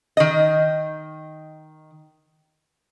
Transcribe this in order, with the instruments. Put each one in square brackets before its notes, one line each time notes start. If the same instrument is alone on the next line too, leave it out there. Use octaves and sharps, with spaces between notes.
[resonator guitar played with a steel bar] D#3 D#5